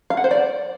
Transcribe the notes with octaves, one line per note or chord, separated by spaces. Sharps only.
F5
F#5
C5
D5